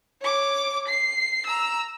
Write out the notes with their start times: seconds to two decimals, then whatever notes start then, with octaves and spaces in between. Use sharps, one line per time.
0.21 C#5 D6
0.88 C7
1.47 A#5 E6